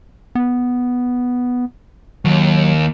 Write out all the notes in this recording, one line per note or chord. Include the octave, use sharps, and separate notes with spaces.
B3
D#2 F#3